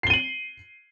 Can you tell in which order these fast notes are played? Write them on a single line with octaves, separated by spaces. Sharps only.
C7 G7 D#7 F#7